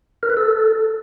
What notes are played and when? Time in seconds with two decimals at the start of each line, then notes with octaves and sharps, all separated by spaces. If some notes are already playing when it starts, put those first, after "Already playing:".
0.23 A#4
0.30 B4
0.37 A4